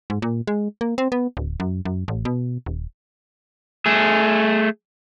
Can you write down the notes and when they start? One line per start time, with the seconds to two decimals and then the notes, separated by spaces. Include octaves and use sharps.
0.10 G#2
0.22 A#2
0.47 G#3
0.81 A#3
0.98 C4
1.12 B3
1.37 D1
1.60 F#2
1.85 F#2
2.08 A1
2.25 B2
2.66 D#1
3.86 A3 G#4